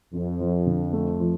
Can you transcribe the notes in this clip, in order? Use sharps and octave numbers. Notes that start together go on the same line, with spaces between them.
F2 F3
F3
D3
A3
F3